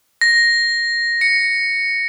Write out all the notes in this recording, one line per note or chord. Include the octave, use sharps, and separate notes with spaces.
A#6
C#7